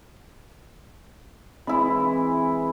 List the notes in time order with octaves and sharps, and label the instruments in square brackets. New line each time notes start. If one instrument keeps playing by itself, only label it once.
[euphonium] E3 [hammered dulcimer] G#3 E4 [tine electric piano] C4 B5